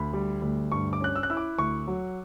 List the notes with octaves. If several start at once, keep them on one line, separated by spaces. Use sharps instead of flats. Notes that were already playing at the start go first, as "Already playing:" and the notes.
Already playing: D2 B5
G3
D2
G2 C#6
D6
C#4 F#6
E6
F#6
E4 E6
D6
D2 C#6
F#3